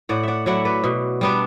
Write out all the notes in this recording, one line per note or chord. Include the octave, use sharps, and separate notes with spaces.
A2 D5 F#5
D5 E5 F#5
F#3 A3 E4 D5 F#5
B4 D5
B2
G3 B3 D4